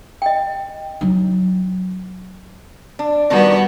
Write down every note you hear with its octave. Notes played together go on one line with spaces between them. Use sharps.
D#5 G5
F#3 D#4
D4
D#3 G3 B3 D4 D#4 F#4